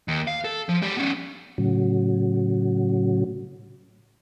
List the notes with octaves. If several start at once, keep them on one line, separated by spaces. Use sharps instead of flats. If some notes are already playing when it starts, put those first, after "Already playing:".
D#2
F5
A4
F3
G#3 G4
B3 C#4
A2 C#3 F#3